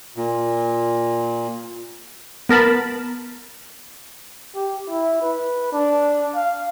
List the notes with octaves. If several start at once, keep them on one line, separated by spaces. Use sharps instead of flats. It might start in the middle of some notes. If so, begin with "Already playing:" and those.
A#2
B3 A#4 A5 B5
G4
E4
B4
D4
F5